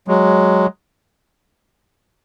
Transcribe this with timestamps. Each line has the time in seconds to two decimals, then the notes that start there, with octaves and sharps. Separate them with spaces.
0.08 F#3 G#3